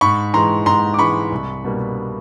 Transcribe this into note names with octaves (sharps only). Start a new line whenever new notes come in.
G#2 B5 C#6
E3 G#3 A#5 C6
G#2 A#5 C6
D6
E3 G#3 B5 C#6
C2
B2 G3 A#3